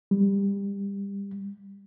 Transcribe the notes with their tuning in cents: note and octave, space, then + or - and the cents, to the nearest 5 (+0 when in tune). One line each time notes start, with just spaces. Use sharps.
G3 +25